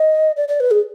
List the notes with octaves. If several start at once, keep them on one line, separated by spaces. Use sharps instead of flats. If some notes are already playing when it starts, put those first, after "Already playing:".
Already playing: D#5
D5
D5
B4
G#4